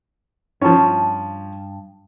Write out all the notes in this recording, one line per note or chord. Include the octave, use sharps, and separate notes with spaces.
G2 F3 C#4 A5